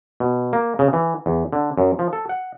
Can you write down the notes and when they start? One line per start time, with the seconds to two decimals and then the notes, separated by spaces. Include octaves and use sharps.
0.20 B2
0.53 A#3
0.79 C#3
0.93 E3
1.26 E2
1.53 D3
1.78 F#2
1.99 F3
2.13 A4
2.29 F#5